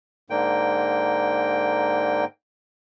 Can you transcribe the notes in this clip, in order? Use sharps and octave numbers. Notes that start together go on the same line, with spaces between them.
G#2 D3 A#3 G5